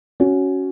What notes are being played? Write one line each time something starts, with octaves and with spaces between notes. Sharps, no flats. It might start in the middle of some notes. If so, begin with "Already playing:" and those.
C#4 F#4